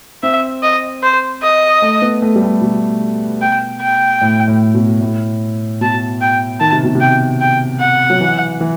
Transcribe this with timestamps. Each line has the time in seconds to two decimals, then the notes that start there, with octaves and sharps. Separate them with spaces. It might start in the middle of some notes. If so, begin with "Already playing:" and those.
0.23 C4 E5
0.63 D#5
1.03 C5
1.43 D#5
1.82 A3
2.02 B3
2.22 A3
2.36 G3
2.42 A3
2.61 B2
3.42 G5
3.81 G5
4.21 A2
4.48 A2
4.74 B2
5.01 A2
5.81 B2 A5
6.21 G5
6.60 D#3 A5
6.72 C3
6.84 B2
6.95 C3
7.01 G5
7.41 G5
7.80 F#5
8.10 F#3
8.20 E3
8.61 E3